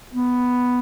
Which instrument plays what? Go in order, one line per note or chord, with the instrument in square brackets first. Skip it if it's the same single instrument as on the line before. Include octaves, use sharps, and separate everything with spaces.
[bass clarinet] B3